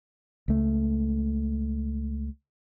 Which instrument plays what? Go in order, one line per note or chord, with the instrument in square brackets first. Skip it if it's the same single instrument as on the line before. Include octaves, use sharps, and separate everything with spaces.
[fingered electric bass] C#2 A3